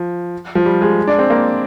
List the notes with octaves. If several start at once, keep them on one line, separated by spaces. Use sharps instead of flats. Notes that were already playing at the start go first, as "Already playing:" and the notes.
Already playing: F3
F3
G3
G#3
D4
C4
A#3